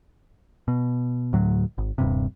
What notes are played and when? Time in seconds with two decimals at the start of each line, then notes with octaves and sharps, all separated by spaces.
0.68 B2
1.33 D2 A2 F#3
1.78 G#1
1.98 D#1 G2 C3